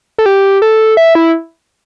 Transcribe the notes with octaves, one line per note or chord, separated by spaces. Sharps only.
A4
G4
A4
E5
E4